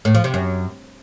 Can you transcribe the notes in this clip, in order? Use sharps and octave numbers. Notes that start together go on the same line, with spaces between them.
A2
F3
C3
F#2